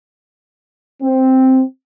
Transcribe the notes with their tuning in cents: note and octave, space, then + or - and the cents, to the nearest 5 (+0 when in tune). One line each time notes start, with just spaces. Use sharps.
C4 +0